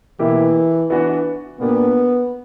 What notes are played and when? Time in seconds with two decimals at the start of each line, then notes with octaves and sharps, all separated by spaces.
0.19 B2 E3 A#3 E4 G4
0.90 E3 B3 D4 F#4
1.60 A#2 A#3 B3 D4 G4